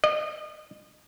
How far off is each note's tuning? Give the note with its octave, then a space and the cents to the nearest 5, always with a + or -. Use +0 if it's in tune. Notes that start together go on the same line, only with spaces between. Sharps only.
D#5 -35